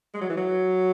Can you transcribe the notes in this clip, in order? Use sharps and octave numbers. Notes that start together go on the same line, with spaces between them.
G#3
F#3
E3
F#3